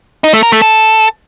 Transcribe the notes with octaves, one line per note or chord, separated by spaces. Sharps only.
D#4
A3
A#4
A3
A4